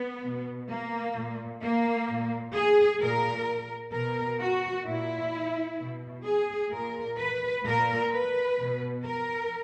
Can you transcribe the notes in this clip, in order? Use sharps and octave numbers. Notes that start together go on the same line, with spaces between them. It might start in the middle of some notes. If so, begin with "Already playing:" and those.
Already playing: B3
B2
A#3
A#2
A#3
A#2
G#4
A#2 A#4
B2 A#4
F#4
A#2 E4
B2
G#4
A#2 A#4
B4
A#2 A#4
B4
B2
A#4